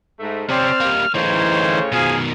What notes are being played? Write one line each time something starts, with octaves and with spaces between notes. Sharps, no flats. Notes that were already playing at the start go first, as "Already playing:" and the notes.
G#2 A3
C3 C4 C#4 C5 D5 F6
G3 A#3
A2 C#3 E3 D#4 C5 C#5
B2 D#3 F3 G#4 F5 G#5